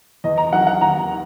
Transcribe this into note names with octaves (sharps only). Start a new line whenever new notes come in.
E2 D#5
A#5
D#3 F#3 F#5
F#5
D#2 A#5